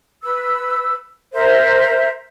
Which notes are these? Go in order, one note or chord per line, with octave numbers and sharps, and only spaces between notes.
B4 E6
A#4 C5 E5